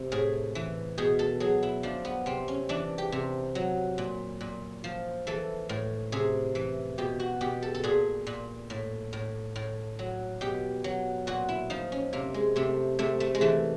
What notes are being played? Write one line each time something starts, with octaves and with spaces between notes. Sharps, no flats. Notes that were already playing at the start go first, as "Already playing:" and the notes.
Already playing: C3
A2 G#4
E3
B2 G#4
A4
F#3 G#4
E4
F3 D4
B3
C3 C4
C#4
E3 D4
G4
C3
F#3
A#2
A#2
F3
E3 A4
A2
C3 G#4
E3
B2 G4
F#4
B2 G4
A4
A4
A#2 G#4
A#2
A2
A2
A2
F#3
B2 G4
F#3
A#2 F#4
E4
F3 D#4
C#4
C3 A#3
G#3
C3 A3
C3 A3
A3
G#3
E3 A3